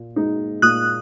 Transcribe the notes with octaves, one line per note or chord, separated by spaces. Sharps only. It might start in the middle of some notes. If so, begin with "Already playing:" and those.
Already playing: A#2
G#3 D#4
A#2 D#6 F#6